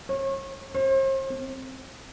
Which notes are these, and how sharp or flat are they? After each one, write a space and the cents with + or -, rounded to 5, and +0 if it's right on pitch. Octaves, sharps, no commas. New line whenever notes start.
C#5 -35
C5 +40
C4 +5